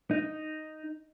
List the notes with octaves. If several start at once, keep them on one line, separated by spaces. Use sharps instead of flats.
D#4